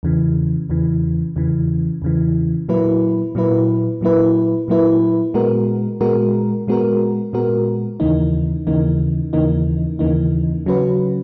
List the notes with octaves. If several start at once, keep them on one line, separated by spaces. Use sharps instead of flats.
E2 C#3 E3
E2 C#3 E3
E2 C#3 E3
E2 C#3 E3
A#2 F#3 A#3 E4 B4
A#2 F#3 A#3 E4 B4
A#2 F#3 A#3 E4 B4
A#2 F#3 A#3 E4 B4
A#2 G#3 B3 F#4 A#4
A#2 G#3 B3 F#4 A#4
A#2 G#3 B3 F#4 A#4
A#2 G#3 B3 F#4 A#4
D#2 C#3 E3 A#3 D#4
D#2 C#3 E3 A#3 D#4
D#2 C#3 E3 A#3 D#4
D#2 C#3 E3 A#3 D#4
C#3 F#3 C#4 F#4 B4